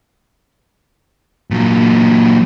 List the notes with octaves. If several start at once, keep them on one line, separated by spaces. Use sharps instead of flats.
A#2 F#3